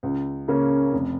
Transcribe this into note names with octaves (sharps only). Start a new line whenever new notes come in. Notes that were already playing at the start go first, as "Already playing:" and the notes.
C#2
C#3 A#3 C#4
F1